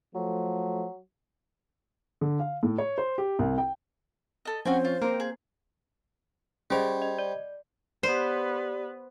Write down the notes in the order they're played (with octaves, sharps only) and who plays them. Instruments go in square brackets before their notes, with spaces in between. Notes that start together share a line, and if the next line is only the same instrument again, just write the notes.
[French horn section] F3 A3 [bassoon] F#3
[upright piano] D3
F5
A2
C#5
C5
G4
C2
G5
[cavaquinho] A4 D#5
[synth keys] F3 C4 C#4 [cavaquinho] F#4 G5 G#5 [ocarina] C5
[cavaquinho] F4
[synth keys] A#3 C4 [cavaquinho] A#4
[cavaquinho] G#4
[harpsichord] G3 C5 [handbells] C#4 G#4 D#5
[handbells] D#5
D5
[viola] B3 B4 [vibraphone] G4 D5 [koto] C5